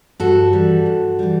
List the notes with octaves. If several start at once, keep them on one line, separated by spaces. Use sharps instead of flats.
G2 F#4 A4
E3 G3
G2
E3 G3